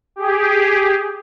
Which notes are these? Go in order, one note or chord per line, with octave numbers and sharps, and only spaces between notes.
G4 G#4